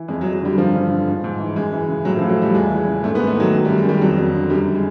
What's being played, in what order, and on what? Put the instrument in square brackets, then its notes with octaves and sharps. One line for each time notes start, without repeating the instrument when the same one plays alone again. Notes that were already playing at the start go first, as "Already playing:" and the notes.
Already playing: [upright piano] E3
F2 G#3
F#3
F2
F#3
D3 G3
G2 F3
G2
D3
G#2
G#2
E3
F#2 G#3
E3
C#3
A2 F#3
F3
A2
F#3
E3 G3
E2 G#3
E3
C#3
G#2 A3
B3
G#2
A3
D#3 F#3
F#2
G3
F#2
G#3
D#3 G3
F2 F#3
F2
D3
F#2 G3
G#3